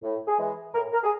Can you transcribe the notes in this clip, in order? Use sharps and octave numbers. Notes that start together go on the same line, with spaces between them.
A2
G#4
E3 G#3
A2 A#4
A#4
G#4